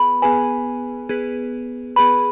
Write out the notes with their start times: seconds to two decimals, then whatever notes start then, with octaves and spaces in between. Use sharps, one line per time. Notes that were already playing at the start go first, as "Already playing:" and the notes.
Already playing: B3 G#4 B4 B5
0.22 B3 G#4 B4 G#5
1.09 B3 G#4 B4
1.96 B3 G#4 B4 B5